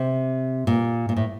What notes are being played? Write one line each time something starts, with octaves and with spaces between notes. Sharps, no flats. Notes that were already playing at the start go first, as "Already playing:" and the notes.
Already playing: C3
A#2
A#2
A2